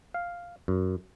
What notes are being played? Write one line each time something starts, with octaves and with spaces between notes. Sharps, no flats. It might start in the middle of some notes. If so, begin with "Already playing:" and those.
F5
F#2